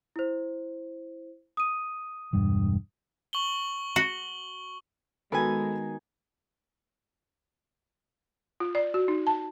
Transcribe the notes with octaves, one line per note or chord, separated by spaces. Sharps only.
E4 C5
D#6 D#7
E1 G2
C#6 F#7 G7
F#4
D#3 G#3 B3 F#4 A4 B4 G#5 B5
F4
D5
F#4
D#4
A5